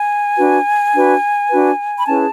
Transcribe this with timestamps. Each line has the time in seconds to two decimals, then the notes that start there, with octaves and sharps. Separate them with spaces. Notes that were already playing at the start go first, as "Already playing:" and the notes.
Already playing: G#5
0.38 D4 F#4 B4
0.94 D4 F#4 B4
1.50 D4 F#4 B4
1.97 B5
2.06 C#4 E4 G#4 B4 A5